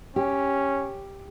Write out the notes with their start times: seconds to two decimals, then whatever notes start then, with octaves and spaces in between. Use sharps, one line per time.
0.16 C#4 G4